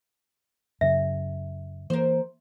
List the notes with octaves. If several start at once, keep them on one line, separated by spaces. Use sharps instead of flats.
F#2 C#3 E5
E3 A#3 A#4 C5